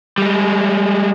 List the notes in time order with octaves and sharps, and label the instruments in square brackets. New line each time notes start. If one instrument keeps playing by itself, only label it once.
[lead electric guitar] G3 G#3